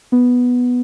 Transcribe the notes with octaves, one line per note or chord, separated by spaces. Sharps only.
B3